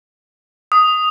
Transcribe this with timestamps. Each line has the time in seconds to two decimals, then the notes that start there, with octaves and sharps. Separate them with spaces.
0.72 D#6